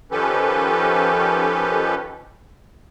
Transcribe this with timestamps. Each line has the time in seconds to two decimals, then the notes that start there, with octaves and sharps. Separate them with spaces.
0.11 D#3 F3 C#4 G4 A4 B4